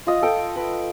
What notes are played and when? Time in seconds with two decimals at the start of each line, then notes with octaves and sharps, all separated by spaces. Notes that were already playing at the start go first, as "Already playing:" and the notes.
0.07 F4 D#5
0.22 A4 G5 D#6
0.56 B4